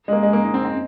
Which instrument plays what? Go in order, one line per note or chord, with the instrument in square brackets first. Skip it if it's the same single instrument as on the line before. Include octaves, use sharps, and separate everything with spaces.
[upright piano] G#3
A#3
G#3
A#3
D#4
C4
C4